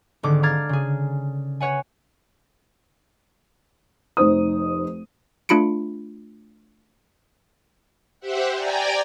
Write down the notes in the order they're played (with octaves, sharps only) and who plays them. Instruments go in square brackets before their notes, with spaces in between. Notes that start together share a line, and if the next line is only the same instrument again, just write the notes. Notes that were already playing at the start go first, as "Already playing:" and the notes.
[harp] G#1 D3 D6
F5 A#5 D6 F6 G#6 A6
C#3 G#4
B4 C#5 F#5 G#5
[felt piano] F1 D#4 C5 D#6
[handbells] A3 D4 F4 B5 C#7 D7
[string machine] G4 C5 E5 F#5
D5 G5 G#5 A#5